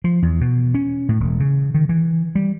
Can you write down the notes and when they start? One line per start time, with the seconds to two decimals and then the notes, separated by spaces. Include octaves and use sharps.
0.04 F3
0.22 E2
0.41 B2
0.74 C#4
1.09 A2
1.20 E1
1.40 C#3
1.74 D#3
1.89 E3
2.35 G3